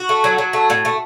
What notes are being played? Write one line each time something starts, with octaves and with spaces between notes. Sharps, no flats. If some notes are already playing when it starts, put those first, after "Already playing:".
Already playing: F#4
A3
F#3
F#3
A3
A2
A3